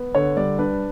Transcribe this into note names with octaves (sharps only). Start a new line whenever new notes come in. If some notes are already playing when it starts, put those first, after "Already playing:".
Already playing: B3
D3 C#5
G3 D5
D4 B4